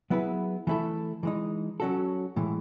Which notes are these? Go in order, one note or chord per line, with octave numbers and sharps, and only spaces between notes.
F#3 B3 E4 G#4 B4
E3 A3 E4 A4
E3 G#3 D#4
F#3 C#4 F#4 A4
A2 E3 G#3